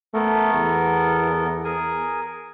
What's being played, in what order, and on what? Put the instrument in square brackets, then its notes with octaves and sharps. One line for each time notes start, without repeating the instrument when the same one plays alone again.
[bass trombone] A3 [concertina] B3 A4 A#4
[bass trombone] E2
[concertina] G#4 A#4 G#5